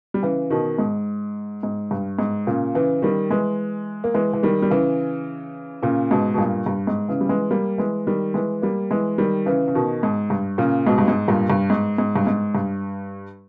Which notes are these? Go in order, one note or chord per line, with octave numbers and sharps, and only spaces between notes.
G3
C#3 E3
B2 D#3
G#2
G#2
G2
G#2
A#2 C#3
C#3 E3
D#3 G3
E3 G#3
A#3
E3 G#3
E3
D#3 G3
G3
C#3 E3
A#2 C#3
G#2 B2
B2
G2 A#2
G2
G#2
C#3 E3
G3
E3 G#3
G3 A#3
E3 G#3
D#3 G3
E3 G#3
G3 A#3
E3 G#3
D#3 G3
C#3 E3
C#3
B2 D#3
G#2
G2
A#2 C#3
G#2 B2
G2
G#2
G2 A#2
G2
G#2
G#2
G2
G#2
G2